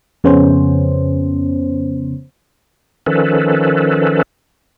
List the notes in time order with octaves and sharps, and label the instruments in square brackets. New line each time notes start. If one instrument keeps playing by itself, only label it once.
[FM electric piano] F2 C#3 B3 C#4 C5
[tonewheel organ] D#3 F3 C#4 A4 B4